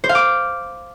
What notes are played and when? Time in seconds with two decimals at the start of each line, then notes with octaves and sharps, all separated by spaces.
0.04 C5
0.09 F5
0.15 D6